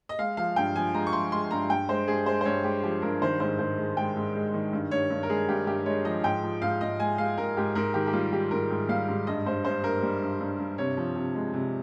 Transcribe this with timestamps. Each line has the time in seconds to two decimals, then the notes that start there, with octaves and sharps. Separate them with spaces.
0.09 D#5
0.19 G#3 F5
0.37 F3 F5
0.56 G2 G5
0.76 F3 G#5
0.94 G#3 A#5
1.07 C#6
1.13 F3 C6
1.32 G#3 C6
1.51 G2 A#5
1.70 G2 G5
1.89 G#3 C5
2.07 G2 G#4
2.26 G#3 C5
2.41 C5
2.45 G2 C#5
2.64 G#3 G4
2.84 F3 G4
3.02 G2 A#4
3.22 D#3 C5
3.40 G#2 C5
3.59 G#2 C5
3.78 G#3
3.97 G#3 G5
4.16 G#2
4.35 G#3
4.54 D#3
4.73 G2
4.91 G2 C#5
5.10 G2
5.23 A#4
5.29 G#3 G#4
5.48 G2 G4
5.67 G2 G4
5.86 G#3 C#5
6.05 F3 D#5
6.24 G#2 G5
6.43 F3
6.62 G#2 F5
6.81 G#2 D#5
7.00 G#3 G#5
7.18 G#3 F5
7.38 G#2 A#4
7.57 G#2 G4
7.75 G#2 A#4
7.94 D#3 G4
8.07 G4
8.13 G3 F4
8.33 D#3 G4
8.51 G#2 A#4
8.70 G#2
8.89 G3 F5
9.08 G#2
9.27 G2 D#5
9.46 G2 C5
9.65 G2 C5
9.83 G2 A#4
10.03 G3
10.22 G2
10.40 G2
10.59 G2
10.78 C3 C#5
10.97 F3
11.16 C3
11.35 G#3
11.54 C3